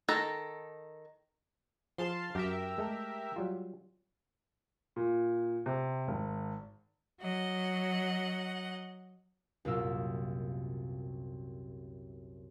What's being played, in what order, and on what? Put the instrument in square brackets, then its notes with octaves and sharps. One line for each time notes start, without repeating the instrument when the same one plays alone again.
[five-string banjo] D#3 A4 A#5
[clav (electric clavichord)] F3 G#4 C5 [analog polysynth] F5 A5 C6
[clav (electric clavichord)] F#2 [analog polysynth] G4 A#4 E5
[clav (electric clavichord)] G#3 A3 A4
F#3 G3 F4
[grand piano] A#2
C3
G#1
[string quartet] F#3 D#5 F#5
[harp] C2 F#2 A#2 F4 A#4 E6